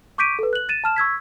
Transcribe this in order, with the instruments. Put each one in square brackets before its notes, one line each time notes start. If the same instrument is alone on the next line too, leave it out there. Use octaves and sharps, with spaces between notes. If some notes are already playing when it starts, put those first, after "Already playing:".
[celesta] C#6 D6 G6 B6 D7 D#7
A4 B4
F#6 F#7
A6 D#7 E7
A5 F6 E7
C#6 E6 G#6 B6